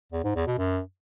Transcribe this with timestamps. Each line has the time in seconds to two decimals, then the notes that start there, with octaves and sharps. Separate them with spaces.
0.12 E2
0.24 G#2
0.35 E2
0.47 B2
0.58 F#2